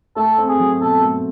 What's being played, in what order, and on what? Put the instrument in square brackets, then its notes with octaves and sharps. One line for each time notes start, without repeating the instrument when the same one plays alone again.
[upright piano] A3 [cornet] A4
[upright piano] C4
[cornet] G#4
[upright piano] F#3
[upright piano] B2 [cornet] A4
[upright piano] A3